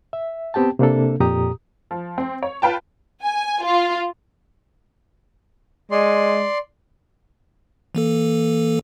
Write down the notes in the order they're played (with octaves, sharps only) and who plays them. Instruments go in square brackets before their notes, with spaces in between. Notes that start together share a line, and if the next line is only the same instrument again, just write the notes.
[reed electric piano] E5
B3 C4 G4 G5 A5
C3 A#3 D4 A4
F2 A#2 G4 A#5 D#6
[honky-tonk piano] F3
C4
C#5
F4 B4 G5 A5
[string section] G#5
F4
[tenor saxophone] G#3 [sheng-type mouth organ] D5 C6
[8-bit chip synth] E3 A#3 A4